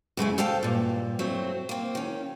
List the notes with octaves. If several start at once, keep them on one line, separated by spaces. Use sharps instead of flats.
F#2 C#3 G#3 A3
A4 C5 F5 G5 A5
G2 A#2
F#3 A3 C4
A#3 C4
D#3 C#4